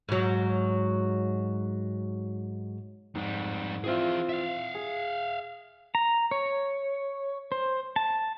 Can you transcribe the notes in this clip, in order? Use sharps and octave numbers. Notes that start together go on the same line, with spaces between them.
G#2 F#3
F2 G#2 G3
E3 C4 F4 G#4 E5
E5 F5
G#4
A#5
C#5
C5
A5